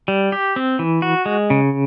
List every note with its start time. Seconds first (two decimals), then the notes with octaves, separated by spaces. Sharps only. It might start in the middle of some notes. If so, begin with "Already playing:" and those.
0.08 G3
0.32 G4
0.56 C4
0.79 E3
1.02 F#4
1.26 G#3
1.50 C#3